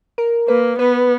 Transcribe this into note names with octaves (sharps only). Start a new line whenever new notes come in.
A#4
A#3 B4
B3 B4